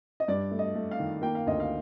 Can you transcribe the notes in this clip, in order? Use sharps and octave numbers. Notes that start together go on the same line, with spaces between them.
D#5
G2 D5
A3
D#5
A3
F5
D#3
A#3 G5
F5
D2 D#5
F5